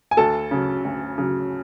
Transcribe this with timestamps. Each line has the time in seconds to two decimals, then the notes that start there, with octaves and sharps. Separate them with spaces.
0.11 G#5
0.17 D2 A4 A5
0.51 C#3 F#3
0.85 D2
1.18 C#3 F#3